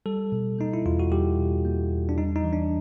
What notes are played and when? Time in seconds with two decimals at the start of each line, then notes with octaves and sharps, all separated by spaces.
0.06 G3 A4
0.32 B2
0.59 A#3 D#4
0.74 E4
0.86 E2 F4
0.99 F#4
1.12 G3 G4
1.38 B2
1.65 A#3
1.91 E2
2.09 D4
2.18 G3 D#4
2.36 D#4
2.44 E3
2.53 D4